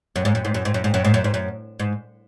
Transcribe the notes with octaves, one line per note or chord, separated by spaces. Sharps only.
F#2
G#2
F#2
G#2
F#2
G#2
F#2
G#2
F#2
G#2
F#2
G#2
F#2
G#2